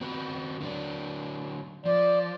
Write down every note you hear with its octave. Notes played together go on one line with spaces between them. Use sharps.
C4 F#4 B4
D3 F#3 D4
F3 D5